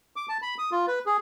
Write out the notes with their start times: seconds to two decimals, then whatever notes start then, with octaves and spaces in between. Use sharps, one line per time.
0.16 D6
0.29 A5
0.42 B5
0.58 D#6
0.72 F4
0.88 B4
1.06 G#4